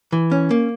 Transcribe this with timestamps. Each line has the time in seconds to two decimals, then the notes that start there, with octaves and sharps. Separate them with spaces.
0.12 E3
0.31 C#4
0.51 A#3